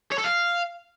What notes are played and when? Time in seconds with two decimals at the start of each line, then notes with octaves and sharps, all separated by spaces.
0.12 C#5
0.18 A4
0.25 F5